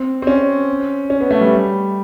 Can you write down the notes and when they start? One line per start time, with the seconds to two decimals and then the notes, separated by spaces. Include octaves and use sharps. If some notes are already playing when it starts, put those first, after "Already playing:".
Already playing: C4
0.22 C4
0.27 C#4
1.10 C#4
1.21 B3
1.31 A3
1.41 G3